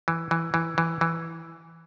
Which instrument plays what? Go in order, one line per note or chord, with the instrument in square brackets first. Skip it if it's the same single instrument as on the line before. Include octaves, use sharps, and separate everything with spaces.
[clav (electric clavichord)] E3
E3
E3
E3
E3